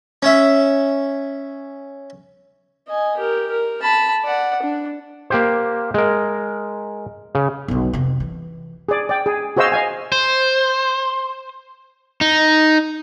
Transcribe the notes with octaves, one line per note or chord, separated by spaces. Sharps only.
C#4 E5
D#5 G#5
G4 A#4
A#4
A5 B5
D5 F#5
D4
A#3 G4 C5
G#3 A#4
C#3
B1 D3
F2 C3
E3
G#4 D5
D5 G5
G#4
F#4 G#4 C5 D#5 F5 E6
D#5 F5 G#5
C5
D#4